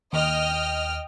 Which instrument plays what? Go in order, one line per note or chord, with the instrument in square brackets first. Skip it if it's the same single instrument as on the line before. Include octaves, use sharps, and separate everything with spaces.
[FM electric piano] D#2 [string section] D#5 G5 F6